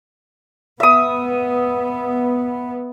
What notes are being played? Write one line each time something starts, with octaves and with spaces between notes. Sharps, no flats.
B3 E5 D#6